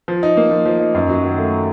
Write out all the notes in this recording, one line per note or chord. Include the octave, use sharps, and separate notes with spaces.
F3
D#4
A#3
F3
F3
D#4
F#2
F#3
D#3
A3